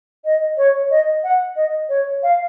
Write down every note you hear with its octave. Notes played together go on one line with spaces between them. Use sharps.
D#5
C#5
D#5
F#5
D#5
C#5
F5